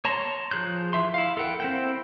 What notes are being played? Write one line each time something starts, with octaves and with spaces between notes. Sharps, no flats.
C#5 A5 A#5 C6
F3 G#4 F#6 G6
E3 E5 C6
E4 F5
A4 A#4 F#5 G5
C4 E4 G5